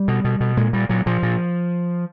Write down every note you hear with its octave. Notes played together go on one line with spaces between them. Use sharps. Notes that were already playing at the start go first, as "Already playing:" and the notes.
Already playing: G3
B2
B2
B2
A#2 G#3
A#2 G3
A#2 F#3
A#2 F3
A#2